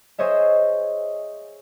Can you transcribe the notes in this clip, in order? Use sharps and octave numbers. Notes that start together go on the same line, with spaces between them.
G#4 C5 C#5 D#5 E5